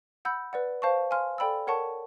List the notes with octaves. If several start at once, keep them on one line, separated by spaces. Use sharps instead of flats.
F#5 B5 E6 G6
B4 D5 F#5
C5 F5 A5 C#6
F5 G#5 C6 F6
A4 D5 G5 B5 E6
A#4 C#5 F#5 A5 C#6